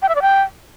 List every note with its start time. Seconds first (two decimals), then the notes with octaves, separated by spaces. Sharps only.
0.02 G5
0.09 E5
0.15 D5
0.22 G5